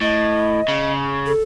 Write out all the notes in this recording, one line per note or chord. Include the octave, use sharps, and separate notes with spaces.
A2 D#5
C#3
A4